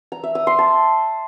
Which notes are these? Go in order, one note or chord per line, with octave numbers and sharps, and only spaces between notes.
A#5
E5
D#6
C6
A5